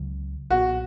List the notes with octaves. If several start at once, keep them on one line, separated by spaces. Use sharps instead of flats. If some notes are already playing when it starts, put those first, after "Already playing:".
Already playing: C#2 C#3 F#3
B1 A#2 F#3 B3 F#4